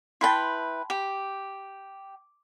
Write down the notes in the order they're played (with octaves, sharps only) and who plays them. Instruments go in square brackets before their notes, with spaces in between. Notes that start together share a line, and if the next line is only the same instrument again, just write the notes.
[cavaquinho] E4 B4 G5 [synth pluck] A5 B5 C6
[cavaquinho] G4